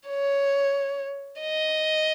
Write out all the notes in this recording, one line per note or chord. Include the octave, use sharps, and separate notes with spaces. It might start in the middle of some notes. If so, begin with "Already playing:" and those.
C#5
D#5